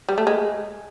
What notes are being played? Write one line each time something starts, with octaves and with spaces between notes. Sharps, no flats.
G3
A3
G#3